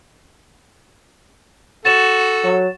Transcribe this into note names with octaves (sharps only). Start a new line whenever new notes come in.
F#4 A4 A6 E7
F#3